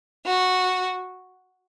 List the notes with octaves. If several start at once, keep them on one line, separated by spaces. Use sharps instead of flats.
F#4